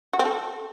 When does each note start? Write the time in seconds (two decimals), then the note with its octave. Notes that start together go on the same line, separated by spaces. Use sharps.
0.13 F#4
0.19 C4
0.25 A4